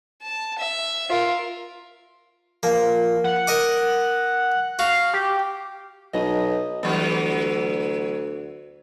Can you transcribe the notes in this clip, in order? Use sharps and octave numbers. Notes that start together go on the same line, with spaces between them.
A5
E5
F4 A#4
F3 A#3
F#5
A#4 D#5 D6
F#4 F5
G4
B1 D#5
D2 E3 F#3 B3